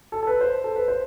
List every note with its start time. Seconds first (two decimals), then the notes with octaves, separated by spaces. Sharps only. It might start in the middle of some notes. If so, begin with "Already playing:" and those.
0.12 A4
0.23 A4
0.27 B4
0.41 C5
0.64 A4
0.76 B4
0.88 C5